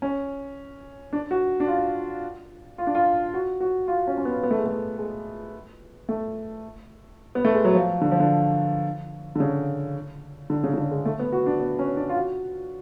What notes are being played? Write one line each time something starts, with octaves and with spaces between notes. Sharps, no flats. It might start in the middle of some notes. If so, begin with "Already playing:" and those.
C#4
D4
F#4
D4
F4
F4
D4
F4
F#4
F#4
F4
C#4
C#4
B3
B3
A3
G#3
A3
G#3
A3
B3
A3
G#3
F#3
F3
D3
F3
D3
D3
C#3
D3
C#3
C#3
D3
G#3
A3
B3
F#4
D4
B3
C#4
D4
F4
F#4